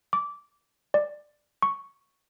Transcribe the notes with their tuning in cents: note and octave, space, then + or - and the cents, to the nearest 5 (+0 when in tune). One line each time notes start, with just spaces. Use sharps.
D6 -15
D5 +15
C#6 +0